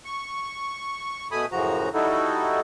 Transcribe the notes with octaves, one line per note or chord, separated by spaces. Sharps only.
C#6
B2 A3 G#5 B5 D#6
F#2 A2 C#3 F3 F#4 A#5
G3 D#4 E4 F#4 A4